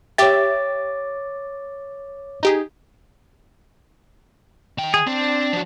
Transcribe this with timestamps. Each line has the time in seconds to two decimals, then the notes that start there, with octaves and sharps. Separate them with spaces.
0.18 G4 C#5 E5 G5 D6 A6
2.43 D#4 G4 G#4
4.78 D#3 G5
4.94 G#4
5.07 C4 D4
5.53 F3 F#4